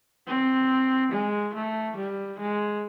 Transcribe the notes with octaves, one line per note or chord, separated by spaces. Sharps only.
C4
G#3
A3
G3
G#3